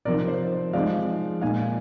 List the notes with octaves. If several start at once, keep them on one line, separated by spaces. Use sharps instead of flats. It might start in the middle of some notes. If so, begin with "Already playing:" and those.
C3 F3 C4 D#4 A#4 D5
C5
F3 G#3 C4 D#4 D5 F5
A#2 G#3 D#4 F5 G#5